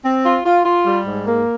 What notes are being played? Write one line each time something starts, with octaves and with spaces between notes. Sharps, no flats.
C4
F4
F4
F4
G3
G#2
A#3